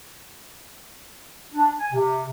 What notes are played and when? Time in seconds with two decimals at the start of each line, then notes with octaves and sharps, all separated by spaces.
1.54 D4
1.79 G#5
1.92 C3